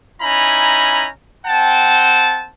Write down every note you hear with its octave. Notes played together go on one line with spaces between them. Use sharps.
C#4 D#4 E4 G#5 A#5 B5
C4 F#5 G5 A5